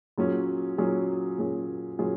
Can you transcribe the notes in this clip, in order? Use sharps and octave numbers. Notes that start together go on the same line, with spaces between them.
A#2 F#3 C#4 G#4
A#2 F#3 C#4 G#4
A#2 F#3 C#4 G#4
A#2 F#3 C#4 G#4